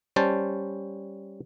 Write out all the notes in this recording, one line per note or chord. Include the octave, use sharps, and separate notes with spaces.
G3 C#4 C5 A5